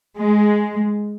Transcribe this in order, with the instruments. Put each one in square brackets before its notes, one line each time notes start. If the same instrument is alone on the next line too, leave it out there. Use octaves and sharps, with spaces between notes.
[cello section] G#3